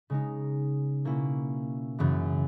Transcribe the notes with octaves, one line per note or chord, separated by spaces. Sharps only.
C#3 G#3 D#4
B2 A#3 C#4 E4
F#2 C#3 E3